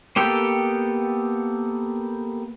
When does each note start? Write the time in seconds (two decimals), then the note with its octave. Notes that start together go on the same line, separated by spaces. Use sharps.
0.16 A#3 B3 G4 A4 G5